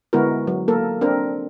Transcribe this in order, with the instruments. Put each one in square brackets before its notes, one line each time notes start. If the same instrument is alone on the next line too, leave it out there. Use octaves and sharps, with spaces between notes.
[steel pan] D3 G#3 B3 E4 F#4 A#4
F#3
A#3 A4 A#4
C4 D4 A#4